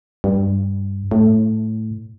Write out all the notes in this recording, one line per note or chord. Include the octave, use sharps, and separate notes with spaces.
G2
A2